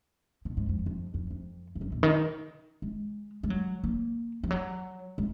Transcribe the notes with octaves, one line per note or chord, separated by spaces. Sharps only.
B2
G#2
F2
F2
F2
F2
F2
F#2
A#2
D#3
G#3
G#3
F#3
A#3
F3
F#3
G#3